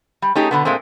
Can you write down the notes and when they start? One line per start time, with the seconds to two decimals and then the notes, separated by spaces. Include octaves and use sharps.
0.22 G3
0.35 A3 C#4 D#4 G4 G#4
0.51 B2 D3 B3
0.65 A#2 G#3 A3 C4